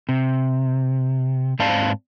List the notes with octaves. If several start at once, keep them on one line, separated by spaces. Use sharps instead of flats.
C3
G#2 C4 D5 F5 A5